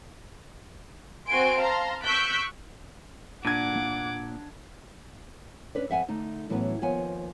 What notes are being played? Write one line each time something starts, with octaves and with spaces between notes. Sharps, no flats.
C4 F#4 G#5 C6 D7
F5 A5 A#5 C6
C#6 E6 F#6 G6 B6 D7
A#2 D4 F#5 D6 G#6
A#3
C#4 D4 B4 D5
F2 E5 F#5 G#5
D3 A3 D#4
A2 E3 F#3 A#3 B3 C#4
D#2 F3 B3 F4 C#5 G#5